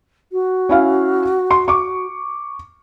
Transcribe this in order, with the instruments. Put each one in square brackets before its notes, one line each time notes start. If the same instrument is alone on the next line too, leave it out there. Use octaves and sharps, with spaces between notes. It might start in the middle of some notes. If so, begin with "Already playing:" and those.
[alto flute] F#4
[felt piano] C#4 E4 F5
C6
C#6 D6